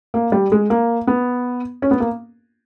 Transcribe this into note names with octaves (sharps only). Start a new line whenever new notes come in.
A#3
G3
G#3
A#3
B3
C#4
B3
A#3